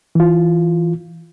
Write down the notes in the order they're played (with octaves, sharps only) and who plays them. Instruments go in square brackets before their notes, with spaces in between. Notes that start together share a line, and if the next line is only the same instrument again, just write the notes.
[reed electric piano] E3 F4